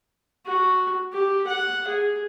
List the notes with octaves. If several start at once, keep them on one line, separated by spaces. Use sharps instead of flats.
F#4
G4
F#5
G#4